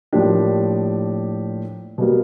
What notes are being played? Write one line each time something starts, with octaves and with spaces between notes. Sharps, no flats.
A2 F3 A#3 D4 G4
B2 G3 A#3